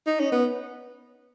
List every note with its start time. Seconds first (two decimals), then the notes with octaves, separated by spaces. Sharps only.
0.07 D#4
0.20 C#4
0.32 B3